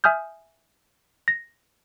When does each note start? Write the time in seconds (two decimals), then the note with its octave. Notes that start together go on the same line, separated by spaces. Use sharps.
0.04 E5 G#5 D#6 F6 G6
1.28 A#6